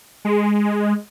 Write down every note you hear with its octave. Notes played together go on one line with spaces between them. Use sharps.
G#3